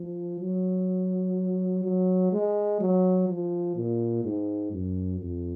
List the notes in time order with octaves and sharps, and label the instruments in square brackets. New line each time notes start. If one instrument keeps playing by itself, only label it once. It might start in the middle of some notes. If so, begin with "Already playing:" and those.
Already playing: [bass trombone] F3
F#3
F#3
G#3
F#3
F3
A#2
G#2
F#2
F2